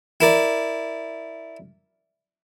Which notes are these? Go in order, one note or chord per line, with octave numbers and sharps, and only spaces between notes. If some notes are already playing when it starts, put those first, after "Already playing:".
E4 A#4 D5